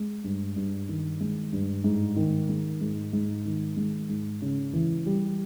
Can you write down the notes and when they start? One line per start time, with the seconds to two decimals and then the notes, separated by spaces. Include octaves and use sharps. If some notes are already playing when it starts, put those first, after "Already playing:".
Already playing: G#3
0.24 G2
0.56 G2
0.89 D#3
1.21 G#3
1.53 G2
1.84 G#2
2.16 D#3
2.49 G#3
2.81 G#2
3.13 G#2
3.45 D#3
3.77 G#3
4.09 G#2
4.42 C#3
4.73 E3
5.06 G3